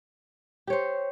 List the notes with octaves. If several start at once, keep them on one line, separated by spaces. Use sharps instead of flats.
G4 C5 C#5